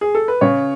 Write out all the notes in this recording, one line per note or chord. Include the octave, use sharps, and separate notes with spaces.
G#4
A4
B4
C#3 C#5